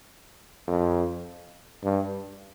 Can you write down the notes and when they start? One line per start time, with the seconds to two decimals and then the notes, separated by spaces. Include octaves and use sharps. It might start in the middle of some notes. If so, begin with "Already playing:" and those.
0.67 F2
1.84 G2